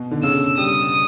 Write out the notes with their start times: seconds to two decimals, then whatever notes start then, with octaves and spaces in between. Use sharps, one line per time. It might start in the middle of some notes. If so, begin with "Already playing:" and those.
Already playing: B2
0.11 D3
0.23 C#3 E6
0.58 G3 D#6